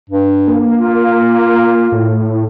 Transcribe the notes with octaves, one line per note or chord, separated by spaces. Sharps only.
G2
A#3
F4
A2